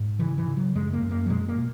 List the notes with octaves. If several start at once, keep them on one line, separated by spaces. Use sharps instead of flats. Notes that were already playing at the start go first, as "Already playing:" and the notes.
Already playing: G#2
C#3 E3
E3
C#3
F#3
F#2 G#3
A#3
F#2
A#3
F#3
B2 G#3
A#3
B2